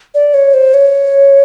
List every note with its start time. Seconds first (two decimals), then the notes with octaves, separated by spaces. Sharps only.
0.14 D5
0.34 C#5
0.54 C5
0.74 C#5